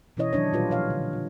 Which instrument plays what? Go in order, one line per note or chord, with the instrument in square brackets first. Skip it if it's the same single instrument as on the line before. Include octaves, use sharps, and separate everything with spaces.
[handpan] B2 E3 C#4 E4 C#5 D#5
D#3 F#3 D4 C#5
A#2 G3 F4 G4 B4
F3 C#5 F5
D3
F4